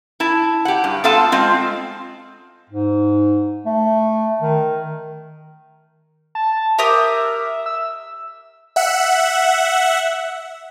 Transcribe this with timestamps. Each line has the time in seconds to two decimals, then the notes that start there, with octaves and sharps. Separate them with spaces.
0.20 E4 A5
0.65 G4 F#5
0.84 G2
1.04 B3 F4 A4 F5 A5
1.32 G#3 C4 F4
2.70 G#2
3.66 A3
4.41 D#3
6.35 A5
6.79 G4 A#4 E5 D#6
7.66 E6
8.76 E5 F#5